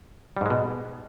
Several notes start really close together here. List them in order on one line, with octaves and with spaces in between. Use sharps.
G3 G#2 G#3 B2